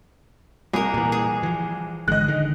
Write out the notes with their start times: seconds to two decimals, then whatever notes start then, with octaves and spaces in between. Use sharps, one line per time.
0.74 C2 G#4 A#4
0.94 A#2 E3
1.12 G#4
1.43 E3 F3
2.08 G#1 D3 G#3 D#5 F#6
2.28 D#1 D3 D#3